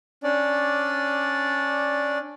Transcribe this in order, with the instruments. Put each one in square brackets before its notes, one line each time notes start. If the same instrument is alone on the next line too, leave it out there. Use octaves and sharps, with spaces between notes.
[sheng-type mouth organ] C#4 D4 D5